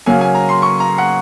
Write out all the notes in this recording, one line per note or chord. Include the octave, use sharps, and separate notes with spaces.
C#3 F#3 A#3 C#4 G#5
G#5
A#5
C6
C#6
A#5
F#5